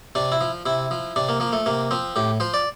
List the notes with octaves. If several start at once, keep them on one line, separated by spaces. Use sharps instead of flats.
C3 D4
E4
F3
C3 E4
F3
C3 D4
A#3
F3 A#3
A3
C3 A#3
F3 C4
A2 G4
F3 C5
D5